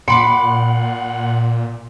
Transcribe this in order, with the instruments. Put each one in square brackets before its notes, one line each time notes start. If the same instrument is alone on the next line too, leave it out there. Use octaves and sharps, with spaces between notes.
[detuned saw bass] A#2 [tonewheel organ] F#5 [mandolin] G5 B5 D6 [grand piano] C6